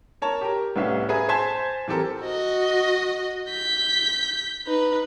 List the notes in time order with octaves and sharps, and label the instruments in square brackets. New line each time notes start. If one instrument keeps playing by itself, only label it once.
[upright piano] A#4 C#5 A5
G4 A#4
C2 A2 B3 C#4 E5 F5
G#4 B4 E5 A#5
C5 G#5 A5 C6 G#6 B6
E3 C4 G4 A4 A#4
[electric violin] F#4 D#5
G6 B6
D#4 B4